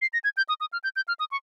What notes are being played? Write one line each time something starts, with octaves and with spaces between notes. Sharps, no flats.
C7
A#6
G#6
G6
D#6
D#6
F6
G6
G6
F6
D#6
C#6